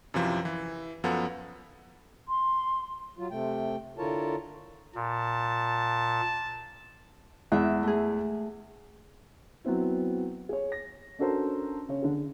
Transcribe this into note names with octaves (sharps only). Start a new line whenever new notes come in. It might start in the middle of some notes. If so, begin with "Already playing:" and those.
F#2 C3 E3 F3
E3
F#2 F3 B3 A4 F#5
C6
F#3 F4
C3 A3 G5
D3 E4 F4 A#4 C#5 A5
A#2 A5
E2 G#3 E5
A3 G#4
F#3 B3 C4 E4
G#4 C#5
A#6
C#4 D4 F#4 A4 A#4 C5
C#3 C#5
D3 G#4